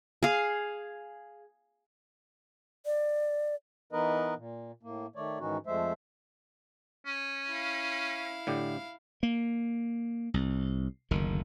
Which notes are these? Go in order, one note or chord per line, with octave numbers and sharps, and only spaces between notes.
G#4 F5
D5
E3 B3 D#4 A#4 B4 D#5
A#2
A2 A#3
D#3 A3 C#5 D5
G#2 D#3 E3 C#4 D#4 F#4
F2 F3 G#3 A3 C5 E5
C#4
E4 F5
A2 D3 G4
A#3
C2
F#1 D2 D#3